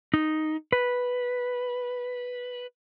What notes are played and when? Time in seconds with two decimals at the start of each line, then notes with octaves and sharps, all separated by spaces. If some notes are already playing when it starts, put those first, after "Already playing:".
0.14 D#4
0.72 B4